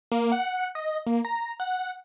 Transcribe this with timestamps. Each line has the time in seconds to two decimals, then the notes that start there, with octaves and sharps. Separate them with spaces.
0.12 A#3
0.32 F#5
0.75 D#5
1.06 A#3
1.25 A#5
1.60 F#5